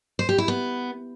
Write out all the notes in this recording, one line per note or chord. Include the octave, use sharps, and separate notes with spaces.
C5
G4
E4
B3